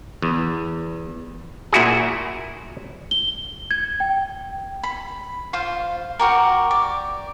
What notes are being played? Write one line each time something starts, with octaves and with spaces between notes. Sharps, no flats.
E2
A#2 E4 F#4 G#4
G7
G#6
G5
B5
F4 C5 F5
F#4 G4 A#4
D5